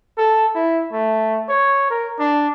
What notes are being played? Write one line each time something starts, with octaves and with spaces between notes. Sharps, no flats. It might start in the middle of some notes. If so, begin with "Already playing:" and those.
A4
E4
A3
C#5
A#4
D4